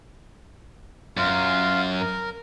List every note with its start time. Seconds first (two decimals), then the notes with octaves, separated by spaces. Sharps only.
1.17 F#2 F4
2.00 A#4